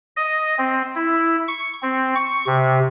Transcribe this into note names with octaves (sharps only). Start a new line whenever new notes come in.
D#5
C4
E4
C#6
C4
C#6
C3